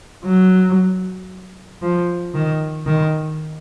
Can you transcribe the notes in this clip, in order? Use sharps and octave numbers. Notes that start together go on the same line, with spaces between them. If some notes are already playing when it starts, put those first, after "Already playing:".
F#3
F3
D#3
D#3